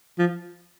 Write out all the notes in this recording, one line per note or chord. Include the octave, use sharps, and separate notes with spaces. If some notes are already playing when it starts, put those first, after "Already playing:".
F3